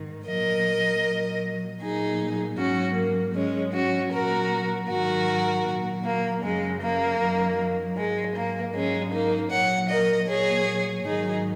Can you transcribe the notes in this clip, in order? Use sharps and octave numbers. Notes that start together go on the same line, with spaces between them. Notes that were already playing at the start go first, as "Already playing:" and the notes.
Already playing: G#2 D#3
A#2 F#3 A#4 D#5
A#2 F#3
A#2 F#3 D#4 G#4
G#2 F#3 C#4 F#4
A#3
G#2 F#3 G#3 C#4
C#4 F#4
A#2 F#3 F#4 A#4
G#2 D#3 F#3 F#4 A#4
A#2 F#3
A#3
F#2 C#3 F#3 G#3
A#3
F#2 D#3 F#3
G#2 F#3 G#3
A#3
G#2 F#3 G#3 C#4
A#3 D#4
A#2 F#3 C#5 F#5
A#4 D#5
A#2 F#3 G#4 C#5
G#2 D#3 F#3 D#4 G#4